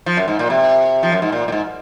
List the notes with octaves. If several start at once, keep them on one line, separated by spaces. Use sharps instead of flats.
F3
F#2
G#2
A#2
C3
F3
F#2
G#2
A#2
A#2
G#2